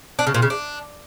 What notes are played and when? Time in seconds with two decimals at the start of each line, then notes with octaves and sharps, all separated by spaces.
0.19 D4
0.27 C#3
0.34 A#2
0.42 C#3
0.50 D4